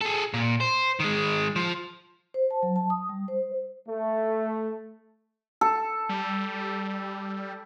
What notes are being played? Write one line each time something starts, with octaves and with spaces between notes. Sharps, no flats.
G#4 A4
A#2
C5
D#3 G#3
F3
C5
A5
F#3
A5
D#6
G3
C5
A3
A4
G3